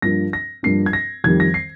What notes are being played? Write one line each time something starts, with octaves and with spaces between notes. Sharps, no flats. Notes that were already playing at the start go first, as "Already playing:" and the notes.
G2 F3 A#3 D4 A#6
A#6
G2 F3 A#3 D4 C7
G#6
A#6
F2 D#3 G3 G#6
A#6
C7